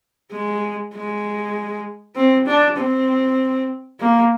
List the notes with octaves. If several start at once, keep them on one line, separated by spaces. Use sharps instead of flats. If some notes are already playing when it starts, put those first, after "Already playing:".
G#3
G#3
C4
D4
C4
A#3